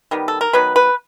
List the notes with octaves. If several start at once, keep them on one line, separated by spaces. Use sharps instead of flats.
D#3 G3 B3
A4
A#4
D#3 F#3 B3 B4
B4